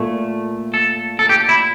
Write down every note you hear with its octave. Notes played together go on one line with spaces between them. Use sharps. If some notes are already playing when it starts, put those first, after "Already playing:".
Already playing: A#2 A3
A4
A4
G4
E4